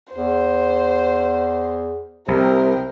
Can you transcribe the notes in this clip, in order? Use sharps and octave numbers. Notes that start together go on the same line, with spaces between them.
E2 C5
C2 C3 A#4 G5